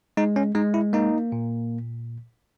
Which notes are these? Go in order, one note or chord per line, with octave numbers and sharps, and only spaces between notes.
G#3 D#4
C#4
G#3 D#4
E4
A#3 D#4
A#2